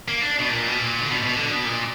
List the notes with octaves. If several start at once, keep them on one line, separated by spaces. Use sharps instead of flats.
A#3
D4
B2
A#2
B2
A#2
D3
B2
B2
D3
B2
A#2